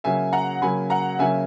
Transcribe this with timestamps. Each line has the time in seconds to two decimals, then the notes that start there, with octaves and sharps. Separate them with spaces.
0.04 C#3 F#3 A#3 E5 G#5
0.33 F#5 A#5
0.62 C#3 F#3 A#3 G#5 B5
0.90 F#5 A#5
1.19 C#3 F#3 A#3 E5 G#5